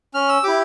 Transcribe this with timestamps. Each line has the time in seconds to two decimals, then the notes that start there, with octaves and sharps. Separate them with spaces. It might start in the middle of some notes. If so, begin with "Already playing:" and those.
0.14 C#4 F6
0.29 E6
0.43 E4 G4 D6